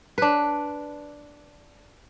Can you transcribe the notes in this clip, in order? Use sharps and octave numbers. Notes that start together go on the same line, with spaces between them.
D4 B4